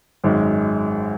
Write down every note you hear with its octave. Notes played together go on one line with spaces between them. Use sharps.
G#1 F#2 D#3 G#3